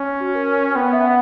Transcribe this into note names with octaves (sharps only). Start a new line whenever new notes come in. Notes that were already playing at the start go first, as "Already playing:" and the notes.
Already playing: C#4
F#4
A#4
A#4
C#5
B3 G5
F#5
E5
F#5